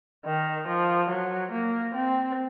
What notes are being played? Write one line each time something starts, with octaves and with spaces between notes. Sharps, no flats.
D#3
F3
F#3
A#3
C4